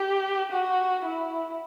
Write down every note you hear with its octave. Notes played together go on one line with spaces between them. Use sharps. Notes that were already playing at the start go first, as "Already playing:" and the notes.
Already playing: G4
F#4
E4